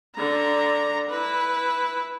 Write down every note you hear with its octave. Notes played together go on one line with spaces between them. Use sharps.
D3 A#5
E4 B4